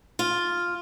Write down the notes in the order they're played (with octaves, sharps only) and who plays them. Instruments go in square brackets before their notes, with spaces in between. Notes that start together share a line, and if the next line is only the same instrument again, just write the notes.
[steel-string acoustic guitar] F4